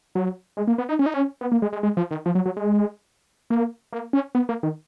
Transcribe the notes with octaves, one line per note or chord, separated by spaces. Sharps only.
F#3
G#3
A#3
B3
D#4
C#4
D#4
C#4
B3
A#3
G#3
G#3
G#3
F3
D#3
F3
F#3
F#3
G#3
A#3
A#3
C#4
B3
A#3
D#3